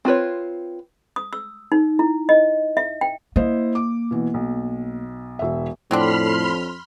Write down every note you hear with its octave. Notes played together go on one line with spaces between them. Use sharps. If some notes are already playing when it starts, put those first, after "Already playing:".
C4 F4 B4 C#5
D#6
E6
D#4
E4
D#5
E5
G5
A#3 E4 C5 D#5
D6
B2 E3
B1
E1 E5
F2 A2 F#3 C4 D4 B5 C6 F6